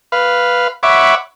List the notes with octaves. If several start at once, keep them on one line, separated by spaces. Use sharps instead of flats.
B4 F5
C#5 E5 F#5 B5 D6